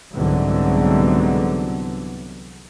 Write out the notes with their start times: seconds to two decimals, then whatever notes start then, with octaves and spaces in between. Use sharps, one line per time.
0.14 C2 G#2 D3 E3 F#3 B3